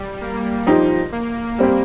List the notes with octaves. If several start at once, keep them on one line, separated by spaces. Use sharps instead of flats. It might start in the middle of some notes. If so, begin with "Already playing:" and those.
Already playing: G3
A#3
F3 D#4 G4 C5
A#3
G3 C4 G4